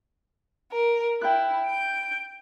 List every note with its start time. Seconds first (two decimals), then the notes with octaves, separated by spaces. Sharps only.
0.72 A#4
1.21 E4 G5 F#6
1.66 G6 D7